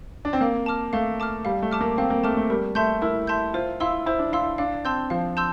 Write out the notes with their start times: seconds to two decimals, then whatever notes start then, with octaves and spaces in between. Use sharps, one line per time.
0.25 D4
0.33 C4
0.41 A#3 F5
0.66 A5 D6 F6
0.93 A3 F5
1.20 A5 D6 F6
1.45 G3 F5
1.62 A3
1.71 A5 D6 F6
1.81 A#3
1.98 C4 F5
2.10 A#3
2.24 A3 A5 D6 F6
2.37 A3
2.50 G3 A#4
2.75 A3 E5 A5 C6 G6
3.02 E4 A#4
3.27 E5 A5 C6 G6
3.54 F4 C5
3.80 E4 F5 C6 E6
4.06 E4 C5
4.19 D4
4.32 E4 F5 C6 E6
4.58 D4 F5
4.85 C4 A5 C6 E6 G6
5.10 F3 F5
5.37 A5 C6 E6 G6